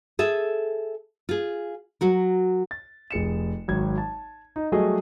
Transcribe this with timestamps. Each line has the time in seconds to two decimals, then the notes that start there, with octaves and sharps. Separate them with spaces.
0.19 G#4 A4 E5
1.29 F4 G#4
2.01 F#3 F#4 A#4
2.71 A6
3.11 F1 G#4 C#7 E7
3.68 G#1 F#3 G#6
3.98 A5
4.56 D#4
4.72 F#3 G3 A3 F#4 G#4 D#5